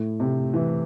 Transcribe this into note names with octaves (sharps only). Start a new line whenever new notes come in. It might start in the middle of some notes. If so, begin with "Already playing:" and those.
Already playing: A2
C3
E3